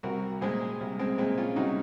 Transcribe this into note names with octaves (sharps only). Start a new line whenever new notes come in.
C2 F#4 A#4
A#2 G#3 G#4 C5
C2
G#3 C4
A#2 G#3 C4
C#4 F4
C2 D#4 F#4